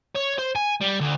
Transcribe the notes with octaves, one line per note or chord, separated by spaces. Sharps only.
C#5
C5
G#5
G3
D2